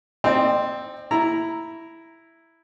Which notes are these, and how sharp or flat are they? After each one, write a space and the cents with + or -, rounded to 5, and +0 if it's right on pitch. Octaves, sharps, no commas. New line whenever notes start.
C4 +0 D#4 +0 D5 +45
E4 +0 A#5 +0